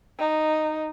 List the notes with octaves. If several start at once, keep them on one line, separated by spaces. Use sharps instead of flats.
D#4